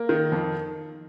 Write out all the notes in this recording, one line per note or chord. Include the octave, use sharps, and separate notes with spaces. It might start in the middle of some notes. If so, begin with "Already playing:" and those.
Already playing: A#3
D#3
F2